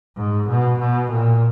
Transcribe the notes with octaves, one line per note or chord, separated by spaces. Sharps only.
G#2
B2
B2
A#2